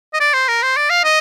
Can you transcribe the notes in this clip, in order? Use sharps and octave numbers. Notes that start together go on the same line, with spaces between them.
D#5
D5
C5
A#4
C5
D5
F5
D#5